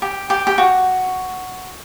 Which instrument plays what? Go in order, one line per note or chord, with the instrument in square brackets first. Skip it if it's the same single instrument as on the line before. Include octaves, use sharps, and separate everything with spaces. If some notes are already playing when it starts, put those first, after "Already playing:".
[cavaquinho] G4
G4
G4
F#4